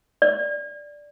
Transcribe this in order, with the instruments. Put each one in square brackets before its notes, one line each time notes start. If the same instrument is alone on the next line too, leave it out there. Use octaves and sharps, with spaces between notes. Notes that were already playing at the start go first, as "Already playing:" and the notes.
[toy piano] D5